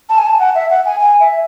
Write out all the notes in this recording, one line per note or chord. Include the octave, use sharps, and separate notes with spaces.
A5
G#5
A5
F#5
E5
F#5
G#5
G#5
E5